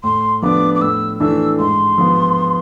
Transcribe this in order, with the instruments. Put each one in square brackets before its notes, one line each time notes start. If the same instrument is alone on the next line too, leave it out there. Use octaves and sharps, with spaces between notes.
[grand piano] A2 [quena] C6
[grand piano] F3 B3 D4 [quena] D6
[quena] D6
[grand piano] A2 [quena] E6
[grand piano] E3 A3 D4 [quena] E6
[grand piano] G#2 [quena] C6
[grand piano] F3 B3